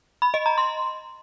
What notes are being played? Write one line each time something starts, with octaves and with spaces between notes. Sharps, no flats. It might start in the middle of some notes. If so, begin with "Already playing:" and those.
B5
D#5
A#5
C6